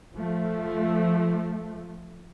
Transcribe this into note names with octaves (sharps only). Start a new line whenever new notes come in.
F3 A3